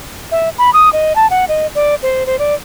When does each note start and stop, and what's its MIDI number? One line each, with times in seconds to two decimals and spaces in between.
0.31 0.49 76
0.58 0.70 83
0.73 0.89 87
0.93 1.13 75
1.15 1.29 81
1.30 1.45 78
1.48 1.67 75
1.75 1.95 74
2.02 2.26 72
2.26 2.39 72
2.39 2.54 74